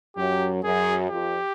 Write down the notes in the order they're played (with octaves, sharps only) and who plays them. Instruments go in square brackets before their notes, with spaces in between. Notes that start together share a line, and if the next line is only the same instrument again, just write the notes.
[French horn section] F#2 F#3 [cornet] G4
[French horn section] F#2 F#3 [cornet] G#4
[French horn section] F2 F3 [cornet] G4